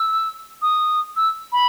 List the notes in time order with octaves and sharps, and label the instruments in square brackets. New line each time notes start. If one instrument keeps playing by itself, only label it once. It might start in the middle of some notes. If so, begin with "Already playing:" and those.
Already playing: [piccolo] E6
D#6
E6
B5